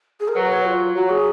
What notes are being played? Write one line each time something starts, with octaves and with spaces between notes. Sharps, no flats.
G#4
A#4
F#3 B4
C#5
F4
F#3 F#4
G#4